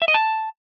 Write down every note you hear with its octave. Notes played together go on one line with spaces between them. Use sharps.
E5
D#5
A5